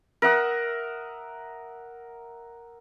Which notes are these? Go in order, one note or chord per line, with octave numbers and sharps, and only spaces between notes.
A#4 E5 F#5 D#6